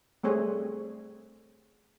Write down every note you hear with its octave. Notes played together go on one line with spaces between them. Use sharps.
G3 A3 C4 G#4 C#5